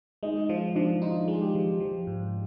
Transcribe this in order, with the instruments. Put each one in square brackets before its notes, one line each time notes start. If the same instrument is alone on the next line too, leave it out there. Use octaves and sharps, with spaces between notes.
[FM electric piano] G#3 [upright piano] D#4
[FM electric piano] F3 [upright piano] D#4
[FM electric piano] F3 [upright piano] D4
[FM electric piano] D#4 [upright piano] F4
[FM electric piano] G#3
[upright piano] G4
[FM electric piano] F3
F3
G#2